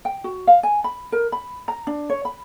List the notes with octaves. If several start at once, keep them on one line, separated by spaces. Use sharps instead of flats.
G5
F#4
F5
G#5
B5
A#4
B5
A#5
D4
C#5
B5